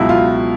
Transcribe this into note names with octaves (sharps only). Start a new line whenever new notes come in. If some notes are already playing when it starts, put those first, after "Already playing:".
Already playing: C#2 B2 F#3 E4
F4